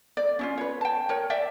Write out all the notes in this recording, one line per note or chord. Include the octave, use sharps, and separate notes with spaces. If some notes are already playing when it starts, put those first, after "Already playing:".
D5
C#4 E4 F4
B4 C#5
G5 A5
A#4 C#5
D5 E5 G5